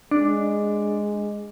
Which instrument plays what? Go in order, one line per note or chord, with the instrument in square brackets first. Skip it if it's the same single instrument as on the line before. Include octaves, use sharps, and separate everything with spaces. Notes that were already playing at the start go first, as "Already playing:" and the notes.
[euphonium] G#3 [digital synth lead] D4